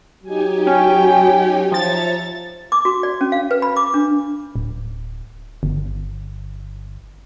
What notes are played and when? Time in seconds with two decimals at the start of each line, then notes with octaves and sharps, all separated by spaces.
0.23 F#3 D#4 G4 G#5
0.67 C#4 G5
1.72 F3 C#5 E5 A#5 A6
2.72 D6
2.85 F#4
3.03 D5
3.21 C#4
3.32 F5
3.51 B4
3.62 B5
3.77 D6
3.94 D4
4.56 D1
5.63 G1